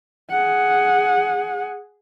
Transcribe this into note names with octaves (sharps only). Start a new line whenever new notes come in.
G#4 F#5